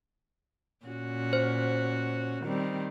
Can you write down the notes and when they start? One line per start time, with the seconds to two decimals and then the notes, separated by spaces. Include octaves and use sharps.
0.86 A#2 C#4 F#4
1.33 C5
2.43 D#3 G3 C4